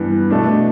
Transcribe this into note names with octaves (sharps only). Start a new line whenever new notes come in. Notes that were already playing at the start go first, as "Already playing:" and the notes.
Already playing: G2 E3 B3
B2 A3 D4